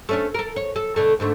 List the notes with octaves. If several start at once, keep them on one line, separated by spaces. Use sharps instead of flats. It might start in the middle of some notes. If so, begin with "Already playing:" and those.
A3 C#4 D4
A4 A#4
C#5
A4
B2 D3 A3
G#2 D3 A3